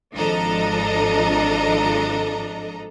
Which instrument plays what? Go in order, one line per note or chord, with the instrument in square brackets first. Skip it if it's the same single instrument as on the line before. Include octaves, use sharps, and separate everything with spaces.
[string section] G#1 F3 D4 A4 D#5 A#5